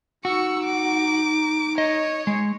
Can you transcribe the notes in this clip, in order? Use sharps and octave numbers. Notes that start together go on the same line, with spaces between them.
D#4 F#4 C#6 E6
D6
C#5 D#5
G#3